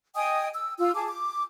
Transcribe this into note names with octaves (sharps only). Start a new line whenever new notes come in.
D#5 G5 G#5 D#6
E6
F4 E6
G#4 A5 D6
D6